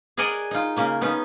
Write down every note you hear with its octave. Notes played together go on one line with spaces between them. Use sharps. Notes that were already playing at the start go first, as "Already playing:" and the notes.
G#4 A#4 D5 D#5 F#5 G#5
D#4 F4
C#3 A#3 C#4
B3 C#4 D#4